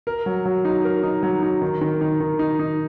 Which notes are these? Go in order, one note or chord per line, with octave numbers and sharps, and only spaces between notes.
A#4
F#3
F#3
D#4
A#4
D#4
F#3
D#4
D#3
D#3
D#4
D#3
D#4
D#4